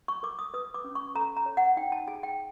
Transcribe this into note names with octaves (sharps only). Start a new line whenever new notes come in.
C#6
A#4 D6
D#6
B4 D#6
D6
C#4
C#6
A4 A#5
A#5
C#5
F#5
D#4 G5
A5
G#4 G#5
G5